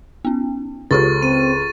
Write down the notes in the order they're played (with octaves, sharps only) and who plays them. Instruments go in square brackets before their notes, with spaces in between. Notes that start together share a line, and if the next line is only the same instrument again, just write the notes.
[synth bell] B3 C#4
[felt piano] C#2 [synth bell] F4 G4 A4 [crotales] C#6 A6
[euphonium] C4 [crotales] D#7